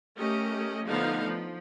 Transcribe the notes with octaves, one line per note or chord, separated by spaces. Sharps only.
A3 C#4 G4 A#4 D#5
D3 F3 A3 B3 D#4 F5
F3